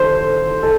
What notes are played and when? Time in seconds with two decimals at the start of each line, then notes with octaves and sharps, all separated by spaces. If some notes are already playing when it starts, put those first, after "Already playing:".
Already playing: D#3 A4 C5
0.63 A4